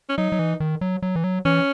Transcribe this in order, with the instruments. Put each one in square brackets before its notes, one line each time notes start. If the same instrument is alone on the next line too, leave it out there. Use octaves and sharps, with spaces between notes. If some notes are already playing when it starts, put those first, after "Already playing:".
[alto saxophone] C#4
[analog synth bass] F#3 [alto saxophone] D#4
[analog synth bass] F#3
E3
D#3
F#3
F#3
E3
F#3
[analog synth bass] E3 [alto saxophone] C#4